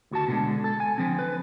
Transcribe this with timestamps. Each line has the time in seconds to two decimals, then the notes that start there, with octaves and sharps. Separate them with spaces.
0.11 D2 F#4 A5
0.28 B2 D3 G#3
0.64 A4
0.80 G#5
0.98 D3 F3 C4
1.19 B4